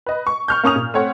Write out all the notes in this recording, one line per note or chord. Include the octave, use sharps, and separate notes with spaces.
B4 D#5
C#6
C#6 F6 G6
A#3 C#4 C#6 D#6 F7
A#2
A3 C4 C#5 F#5